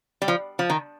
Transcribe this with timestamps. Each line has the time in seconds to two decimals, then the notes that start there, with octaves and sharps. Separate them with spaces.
0.22 G3
0.28 F3
0.59 F3
0.70 D#3